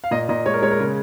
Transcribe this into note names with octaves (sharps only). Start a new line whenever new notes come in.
F5
A#2 D#5
A#2 D#5
G#3 C#5
A#4
G#3 C#5
A#4
C#3